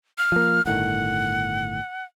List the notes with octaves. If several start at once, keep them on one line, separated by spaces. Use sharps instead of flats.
F6
F3 A#3
G1 A2 D#3 F#5